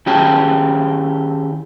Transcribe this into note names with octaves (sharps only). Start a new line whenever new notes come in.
D#3 C#4 E4 G4 G#4 A5